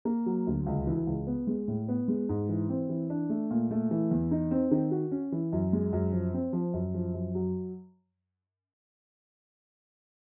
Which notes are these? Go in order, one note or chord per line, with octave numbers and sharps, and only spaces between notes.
A#3
F#3
D2
C#2
E3
C#2
B3
G#3
A2
B3
G#3
G#2
E3
C4
E3
D4
A3
A#2
A3
E3
E2
D#4
C4
D#3
F#4
C#4
E3
F#2
G#3
F#2
F3
C4
F3
F#2
F3
F#2
F#3